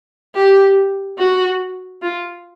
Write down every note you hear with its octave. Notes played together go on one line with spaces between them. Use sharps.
G4
F#4
F4